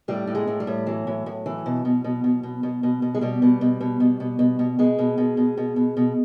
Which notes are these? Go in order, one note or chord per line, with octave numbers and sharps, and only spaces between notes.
A2 G3
A2
G#3
A2
G3
A2
E3 F#3
A2
A2
E3
B2
B2
B2
B2
B2
B2
B2
B2
G#3
B2 G3
B2
B2
B2
B2
B2
B2
B2
B2 G#3
B2
B2
B2
B2
B2
B2